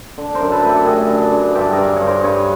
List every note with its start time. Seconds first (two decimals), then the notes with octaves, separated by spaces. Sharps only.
0.18 D3
0.35 A#4 C5
0.41 F#2
0.52 A4 B4
0.64 A3
0.69 G4 A4
0.86 F#2 F#4 G#4
1.09 D3
1.33 D3
1.55 G2 G4 A4
1.73 G#4 A#4
1.78 G2
1.96 G2 C#5
2.07 A#4 C5
2.24 G2 B4 C#5